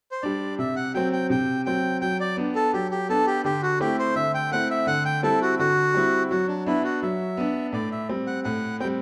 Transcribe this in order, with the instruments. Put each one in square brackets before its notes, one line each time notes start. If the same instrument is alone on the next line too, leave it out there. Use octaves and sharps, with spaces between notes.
[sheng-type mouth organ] C5
[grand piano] G3 D4 [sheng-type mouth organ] D5
[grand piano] C3 [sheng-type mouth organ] E5
[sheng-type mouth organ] F#5
[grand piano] F#3 C4 [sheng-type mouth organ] G5
[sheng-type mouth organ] G5
[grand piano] C3 [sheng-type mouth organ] G5
[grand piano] F#3 C4 [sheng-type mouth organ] G5
[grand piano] F#3 [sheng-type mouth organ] G5
[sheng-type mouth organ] D5
[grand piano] B3 D4
[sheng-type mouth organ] A4
[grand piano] F#3 [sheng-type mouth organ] G4
[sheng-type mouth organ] G4
[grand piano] B3 D4 [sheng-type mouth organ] A4
[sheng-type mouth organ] G4
[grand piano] D3 [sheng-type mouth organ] G4
[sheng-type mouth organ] F#4
[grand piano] A3 C4 E4 [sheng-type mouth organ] G4
[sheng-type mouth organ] C5
[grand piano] D3 [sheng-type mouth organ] E5
[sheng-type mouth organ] G5
[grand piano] A3 C4 E4 [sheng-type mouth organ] F#5
[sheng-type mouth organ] E5
[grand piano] D3 [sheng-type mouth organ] F#5
[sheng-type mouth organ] G5
[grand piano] G3 C4 E4 [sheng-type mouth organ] A4
[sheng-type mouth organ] F#4
[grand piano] D3 [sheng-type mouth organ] F#4
[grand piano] G3 C4 E4
[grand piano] F#3 [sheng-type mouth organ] F#4
[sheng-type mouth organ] D4
[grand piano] B3 D4 [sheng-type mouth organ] E4
[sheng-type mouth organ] F#4
[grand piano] F#3 [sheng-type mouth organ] E5
[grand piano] B3 D4
[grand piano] A2 [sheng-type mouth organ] D5
[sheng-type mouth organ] E5
[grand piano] G3 C4
[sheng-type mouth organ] F#5
[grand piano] A2 [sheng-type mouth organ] F#5
[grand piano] G3 C4 [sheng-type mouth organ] G5